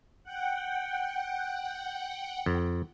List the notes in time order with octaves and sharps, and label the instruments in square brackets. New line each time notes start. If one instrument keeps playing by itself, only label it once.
[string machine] F#5 G5
[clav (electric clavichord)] F2